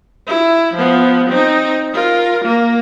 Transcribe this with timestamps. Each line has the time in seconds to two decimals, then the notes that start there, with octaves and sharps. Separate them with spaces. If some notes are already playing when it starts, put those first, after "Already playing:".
0.27 E4
0.74 F3 B3
1.29 C4 D#4
1.93 F4 A#4
2.44 A#3